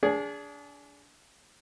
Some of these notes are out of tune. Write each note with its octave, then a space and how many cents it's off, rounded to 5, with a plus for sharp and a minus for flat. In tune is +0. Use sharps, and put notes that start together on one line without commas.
D4 -30 G#4 +0